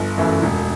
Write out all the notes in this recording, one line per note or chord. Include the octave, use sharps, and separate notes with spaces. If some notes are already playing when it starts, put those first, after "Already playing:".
Already playing: G1
F#2 E3 A3
E1